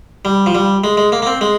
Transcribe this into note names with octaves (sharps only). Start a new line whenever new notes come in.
G3
F3
G3
G#3
G#3
A#3
A#3
C4
G#3